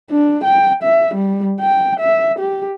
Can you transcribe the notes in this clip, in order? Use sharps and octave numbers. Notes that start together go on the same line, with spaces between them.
D4
G5
E5
G3
G5
E5
G4